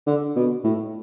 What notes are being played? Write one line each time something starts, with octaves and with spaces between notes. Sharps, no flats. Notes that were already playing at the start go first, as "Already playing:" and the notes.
D3
B2
A2